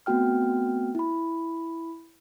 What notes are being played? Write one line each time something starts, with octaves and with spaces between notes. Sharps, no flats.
A3 B3 C4 F#4 G5 F6
E4 B5